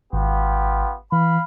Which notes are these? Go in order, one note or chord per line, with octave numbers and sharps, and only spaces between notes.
G#1 B3 F4 G4
E3 F5 B5